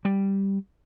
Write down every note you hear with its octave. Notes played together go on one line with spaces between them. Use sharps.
G3